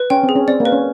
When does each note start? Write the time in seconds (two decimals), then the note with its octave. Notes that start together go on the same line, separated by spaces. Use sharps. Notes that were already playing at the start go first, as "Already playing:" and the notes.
Already playing: B4
0.10 C#4 G5
0.23 C4
0.29 G#4
0.35 C#4
0.48 C4 D5
0.60 A#3
0.65 B4
0.72 C#4